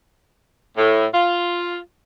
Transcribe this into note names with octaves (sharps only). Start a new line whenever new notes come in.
A2
F4